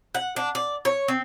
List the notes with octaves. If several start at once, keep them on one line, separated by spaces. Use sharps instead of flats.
F#5
D4
D5
C#5
C4